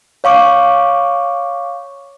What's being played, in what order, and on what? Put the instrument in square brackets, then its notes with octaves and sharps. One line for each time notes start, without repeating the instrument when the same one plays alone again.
[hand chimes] C#5 F5 C#6 D6